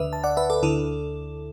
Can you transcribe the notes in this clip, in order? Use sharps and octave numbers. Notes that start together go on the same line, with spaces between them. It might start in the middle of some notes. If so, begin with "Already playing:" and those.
Already playing: D2 D3 B4 E5
A5
D5 F#5
B4 E5
A4 D5
D2 D3 E4 A4